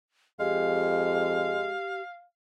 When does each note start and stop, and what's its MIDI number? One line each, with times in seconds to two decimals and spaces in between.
0.40 1.68 41
0.40 1.72 56
0.40 2.02 67
0.40 2.23 77